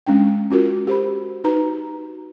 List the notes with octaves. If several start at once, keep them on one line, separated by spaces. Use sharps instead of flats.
G#3 C#4 D4 G5
C#4 F4 F#4 A#4
G4 C5 B5
D#4 F#4 B4 A#5